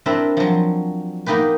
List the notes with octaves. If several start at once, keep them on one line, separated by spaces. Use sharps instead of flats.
C4 D4 E4 A#4 B4
F3 F#3
A#3 B3 D#4 G4 B4